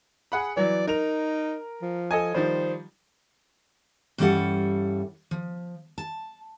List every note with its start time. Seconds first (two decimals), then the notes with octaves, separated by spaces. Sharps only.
0.32 G#4 F#5 B5
0.57 E3 F#3 D5
0.87 D#4 A#4 F7
1.82 F3
2.11 A4 D#5 G#5
2.34 D#3 F3 G3 C5
4.18 G2 E3 G3 C#4 A4 F#5
5.31 F3
5.98 A5